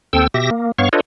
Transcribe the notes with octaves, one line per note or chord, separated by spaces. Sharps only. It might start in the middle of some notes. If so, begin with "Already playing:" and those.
D#2 C4 A4 G5 E6
B2 G4 E5 A#6
A#3
G2 B3 C#5 F5 C#6
D4 F4 A4 B4 C#5 D#5